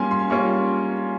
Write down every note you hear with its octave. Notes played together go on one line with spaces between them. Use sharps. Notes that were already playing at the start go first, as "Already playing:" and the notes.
Already playing: G3 A#3 C#4 F4 G#5 C6
C6
G3 A#3 C#4 F4 C#6